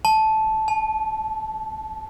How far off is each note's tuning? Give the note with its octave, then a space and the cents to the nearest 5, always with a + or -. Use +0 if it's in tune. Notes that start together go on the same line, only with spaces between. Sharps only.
A5 -10
A5 -45